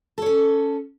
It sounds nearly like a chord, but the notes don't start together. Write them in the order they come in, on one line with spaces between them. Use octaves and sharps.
A4 C#5 C#4